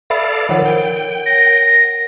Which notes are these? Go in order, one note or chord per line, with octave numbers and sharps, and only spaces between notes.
A4 B4 D5 E5 F5 B5
D#3 F3 A#4 C#5 F#5
G5
A#6